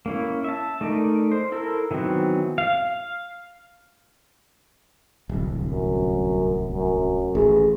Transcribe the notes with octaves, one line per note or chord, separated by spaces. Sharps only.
A#3 C#4 E4
E5 A5
A3 D#4 A#4 D5
C5
E4 A4 A#4
D#3 E3 F#3 B3 C4
F5
D1 C2
F#2
F#2
A1 G#4